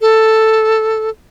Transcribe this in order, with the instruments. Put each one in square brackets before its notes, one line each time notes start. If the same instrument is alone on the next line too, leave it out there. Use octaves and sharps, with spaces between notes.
[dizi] A4